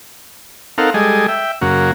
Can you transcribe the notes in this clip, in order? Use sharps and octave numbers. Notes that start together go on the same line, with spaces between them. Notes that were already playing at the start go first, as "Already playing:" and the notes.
C4 D#4 A4 A#4 F5 F#5
G3 G#3 G#4 A4 D#5
E5 G5
F#2 C#3 A#3 F#4